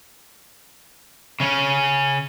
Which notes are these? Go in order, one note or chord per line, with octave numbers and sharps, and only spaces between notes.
C#3 C#4